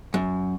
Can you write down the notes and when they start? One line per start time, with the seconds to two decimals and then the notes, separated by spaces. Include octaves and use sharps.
0.14 F#2